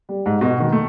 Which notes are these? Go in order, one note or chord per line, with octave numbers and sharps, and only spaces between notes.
G3
G#2
B2
D#3
A3